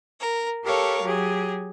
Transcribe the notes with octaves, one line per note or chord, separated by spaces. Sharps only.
A#4
G4 A4 A#4 C#5 F5
F#3 G4 G#4